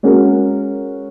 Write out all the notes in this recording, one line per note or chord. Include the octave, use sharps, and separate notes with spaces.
G#3 C#4 F#4 A#4